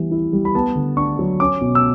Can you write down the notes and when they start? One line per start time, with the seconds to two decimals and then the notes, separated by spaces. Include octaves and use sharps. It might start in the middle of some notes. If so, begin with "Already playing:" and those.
Already playing: E3 G3 B3
0.11 E4
0.33 G3
0.45 B5
0.55 B3 A5
0.75 D3
0.97 D4 C#6
1.19 F#3
1.40 C#4 D6
1.61 B2
1.75 E6